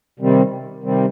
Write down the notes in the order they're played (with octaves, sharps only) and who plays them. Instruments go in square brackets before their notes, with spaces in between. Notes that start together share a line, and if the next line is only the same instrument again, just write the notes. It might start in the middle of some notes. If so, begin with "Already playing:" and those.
[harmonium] C3 D#3 G3 C4
C3 D#3 G3 C4